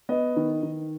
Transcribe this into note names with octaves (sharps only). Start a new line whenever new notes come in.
B3 D#5
D#3
D#3